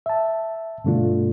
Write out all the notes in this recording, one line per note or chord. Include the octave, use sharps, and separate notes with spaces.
E5 A5
G2 B2 D3 A3 D4 F4